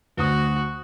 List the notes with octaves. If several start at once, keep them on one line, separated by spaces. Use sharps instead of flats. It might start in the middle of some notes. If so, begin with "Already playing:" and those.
D2 F#4 C5 D#6